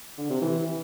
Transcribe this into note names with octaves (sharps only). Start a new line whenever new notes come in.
D3
C3
E3